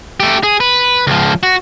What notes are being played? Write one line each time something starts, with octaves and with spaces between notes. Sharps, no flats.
A3 G4
G#4
B4
C#2 F3
F#4